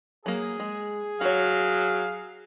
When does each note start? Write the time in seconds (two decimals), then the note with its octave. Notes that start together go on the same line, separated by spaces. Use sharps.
0.26 F#3 A#3 G#4
0.60 G#3
1.21 F#3 F#4 C#5 F5